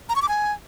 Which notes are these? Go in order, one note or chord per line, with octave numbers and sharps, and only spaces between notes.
A#5
C#6
D6
G#5